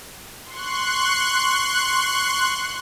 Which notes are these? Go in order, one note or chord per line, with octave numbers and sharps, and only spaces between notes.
C6 C#6 F#6